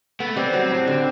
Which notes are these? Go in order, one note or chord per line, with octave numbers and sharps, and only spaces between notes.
A3 B3
G3 C4
F#3
A2
D3